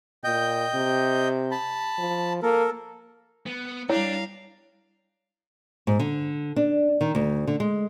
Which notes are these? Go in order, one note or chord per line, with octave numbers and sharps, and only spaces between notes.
A#2 D#5 G5 G6
C3
A5 B5
F3
A#3 A4 A#4
B3
G3 D4 E4 C#5 F5 A#5
G#2
D3
D4
D#3
D2
D3
G#3